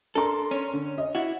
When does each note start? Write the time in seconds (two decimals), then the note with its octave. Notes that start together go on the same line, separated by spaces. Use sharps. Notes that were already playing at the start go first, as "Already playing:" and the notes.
0.15 D4 A4 A#4 C6
0.51 C#4
0.73 D3
0.98 D#5
1.15 E4 F#4